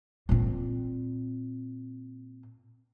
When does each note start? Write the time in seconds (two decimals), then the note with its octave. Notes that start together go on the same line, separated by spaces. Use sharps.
0.29 A#2 C4